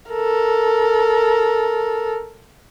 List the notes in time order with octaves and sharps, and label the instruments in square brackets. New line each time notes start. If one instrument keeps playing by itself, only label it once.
[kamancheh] A4 A#4